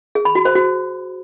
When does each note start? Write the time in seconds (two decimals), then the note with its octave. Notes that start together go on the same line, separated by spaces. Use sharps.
0.15 G#4
0.25 B5
0.35 F#4
0.45 C5
0.55 F#4